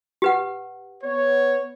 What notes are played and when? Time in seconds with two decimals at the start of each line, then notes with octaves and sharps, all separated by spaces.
0.22 G4 B4 F#5
1.04 B3 C#5